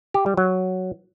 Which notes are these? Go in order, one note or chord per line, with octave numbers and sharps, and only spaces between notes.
G4
G3
F#3